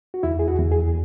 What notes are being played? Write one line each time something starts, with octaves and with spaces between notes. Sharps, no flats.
F#4
E2 E4
G#4
F#4
E2
G#4